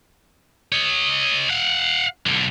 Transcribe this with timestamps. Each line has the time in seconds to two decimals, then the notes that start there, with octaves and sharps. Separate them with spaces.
0.72 C#5 D#5
1.50 F5 F#5
2.26 B1 D3